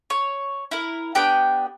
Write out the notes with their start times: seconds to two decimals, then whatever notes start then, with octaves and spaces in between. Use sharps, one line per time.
0.10 C#5
0.71 E4 A#4
1.15 B3 D4 G4 G5